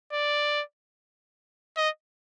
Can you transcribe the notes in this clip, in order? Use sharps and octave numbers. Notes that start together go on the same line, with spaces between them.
D5
D#5